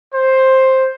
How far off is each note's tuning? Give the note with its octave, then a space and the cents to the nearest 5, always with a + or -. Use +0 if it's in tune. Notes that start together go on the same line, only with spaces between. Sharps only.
C5 +10